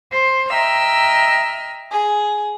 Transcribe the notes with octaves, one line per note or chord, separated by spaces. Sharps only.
C5
D#5 E5 G5 A#5 E6 F6
G#4